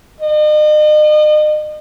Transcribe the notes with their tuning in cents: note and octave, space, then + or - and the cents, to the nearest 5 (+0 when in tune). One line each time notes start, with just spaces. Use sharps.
D#5 -40